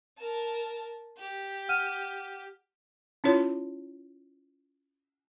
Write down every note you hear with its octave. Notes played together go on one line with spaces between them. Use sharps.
A#4 A5
G4
F#5 F6 D#7
C#4 E4 F4 C#5